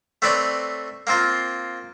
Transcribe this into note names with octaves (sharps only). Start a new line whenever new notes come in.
A3 C4 B4 C#5 D5
A#3 C4 F4